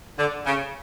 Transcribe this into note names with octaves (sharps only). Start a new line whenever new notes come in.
D3
C#3